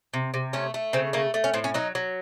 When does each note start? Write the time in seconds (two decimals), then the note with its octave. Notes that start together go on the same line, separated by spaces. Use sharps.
0.14 C3
0.34 C3
0.53 A3 C#4
0.74 A3
0.93 C#3 C4
1.13 A3 A#3
1.34 A3
1.44 C#4
1.54 A2 C4
1.64 C#4
1.74 F#3 D#4
1.95 F#3